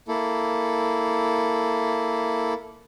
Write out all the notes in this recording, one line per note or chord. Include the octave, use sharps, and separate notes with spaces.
A#3 E4 A4